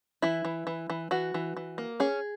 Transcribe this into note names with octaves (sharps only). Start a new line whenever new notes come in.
E3 E4
E3
E3
E3
E3 F#4
E3
E3
A#3
C#4 G#4